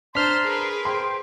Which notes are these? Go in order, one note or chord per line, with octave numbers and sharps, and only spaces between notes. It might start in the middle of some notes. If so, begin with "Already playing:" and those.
D4 C5 A5 A#5 C6 F6 B6
G#4 A#4 B4
C5 G5 C6